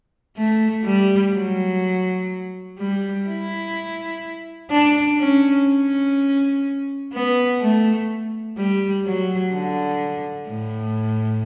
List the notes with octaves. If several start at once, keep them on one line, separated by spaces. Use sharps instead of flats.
A3
G3
F#3
G3
E4
D4
C#4
C#4
B3
A3
G3
F#3
D3
A2